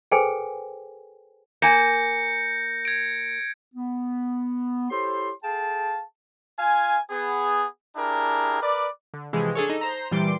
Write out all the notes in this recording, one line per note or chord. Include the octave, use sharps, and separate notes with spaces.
G#4 A4 B4 C5 G5 G#5
A#3 G#5 G6 A#6 C#7
G#6 D7
B3
E4 G4 A4 C5 C#5 C6
G#4 A4 F5 G5 A5
F4 F5 G#5
B3 G#4
D4 E4 G4 G#4 A#4
A#4 B4 D5
D3
C3 E3 F3 G#3
D4 G#4 A4 C#5
D#4 A4
C5 A#5
A#2 E3 G3 C6 D6 D7